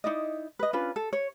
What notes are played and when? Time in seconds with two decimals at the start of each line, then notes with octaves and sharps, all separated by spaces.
0.04 D#4 E4 D5 D#5
0.59 B4 D#5
0.73 C#4 D4 F4 B4
0.96 A4
1.13 C#5